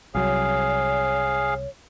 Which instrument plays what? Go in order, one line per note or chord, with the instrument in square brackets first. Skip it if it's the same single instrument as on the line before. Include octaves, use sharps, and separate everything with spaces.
[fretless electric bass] C2 F#3 [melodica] G#4 F5 [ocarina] C#5